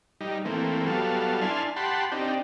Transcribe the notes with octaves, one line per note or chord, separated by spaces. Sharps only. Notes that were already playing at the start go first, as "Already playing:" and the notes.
G3 D#4
E3 A3 A#3 C4
F#3 G3 B3 A4 F5
D4 E4 G#5 A5 C6 F6
G4 F#5 A5 B5 C6
C4 D4 D#4 G4